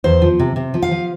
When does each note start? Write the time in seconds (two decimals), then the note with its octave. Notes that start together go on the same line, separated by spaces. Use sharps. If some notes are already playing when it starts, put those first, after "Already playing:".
0.04 E2 C5
0.22 F3
0.40 C3
0.56 C3
0.74 F3
0.82 F5
0.91 F3